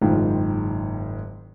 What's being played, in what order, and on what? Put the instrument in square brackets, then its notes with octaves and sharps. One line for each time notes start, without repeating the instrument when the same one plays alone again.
[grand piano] F#1 G#2 D#3 F4 G5